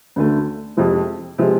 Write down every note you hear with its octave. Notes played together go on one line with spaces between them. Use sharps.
D2 D3 A3
F2 C3 F3 G#3
C3 F3 G#3